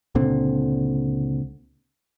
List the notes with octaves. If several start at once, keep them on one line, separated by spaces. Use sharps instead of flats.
C#2 A#2 D3 C4